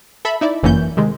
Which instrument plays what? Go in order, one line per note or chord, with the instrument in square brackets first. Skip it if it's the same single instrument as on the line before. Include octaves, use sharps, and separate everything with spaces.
[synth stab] A4 E5 B5
D#4 E4 D5
G1 F#2 E3 A#3 C#4 G6
C3 D#3 G#3